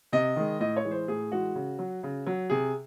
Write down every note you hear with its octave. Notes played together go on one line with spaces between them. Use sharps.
C3 D#5
D#3 G#3
A2 D#5
C#5
E3 G#3
C5
A2 G#4
E3 G#3 F#4
C#3
F#3
C#3
F#3
C3 G#4